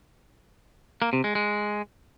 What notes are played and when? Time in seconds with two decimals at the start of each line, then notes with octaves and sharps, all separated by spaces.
1.02 A#3
1.13 C3
1.24 G#3
1.35 G#3